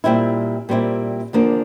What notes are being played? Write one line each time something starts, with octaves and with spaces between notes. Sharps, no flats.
A#2 G3 C4 E4
A#2 G3 C4 E4
E2 D3 F3 A#3 D4